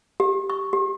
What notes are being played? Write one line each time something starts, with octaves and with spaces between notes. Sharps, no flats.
G4
C#6
G4